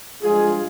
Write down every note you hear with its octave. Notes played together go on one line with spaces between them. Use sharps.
G2 F3 G#3 F4 G#4